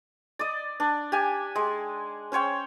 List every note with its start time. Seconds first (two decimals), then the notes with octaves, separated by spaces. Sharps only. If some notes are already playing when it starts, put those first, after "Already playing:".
0.39 D5 D#5
0.80 D4
1.12 G4 G#5
1.56 G#3
2.32 C#4 C5 C#5 G5